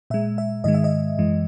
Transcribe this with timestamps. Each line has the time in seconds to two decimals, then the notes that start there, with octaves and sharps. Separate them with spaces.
0.10 A#2 G#3 E5
0.38 E5
0.64 G#2 D#3 G#3 D#5
0.74 E5
0.84 D#5
1.18 F#2 E3 G#3